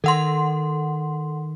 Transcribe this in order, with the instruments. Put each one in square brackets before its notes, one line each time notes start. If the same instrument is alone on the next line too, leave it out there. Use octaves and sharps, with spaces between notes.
[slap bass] D#3 [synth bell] A4 F#5 C6